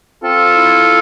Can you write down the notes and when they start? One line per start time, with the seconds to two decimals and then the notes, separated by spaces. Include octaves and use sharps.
0.23 C4 F4 A4
0.55 E4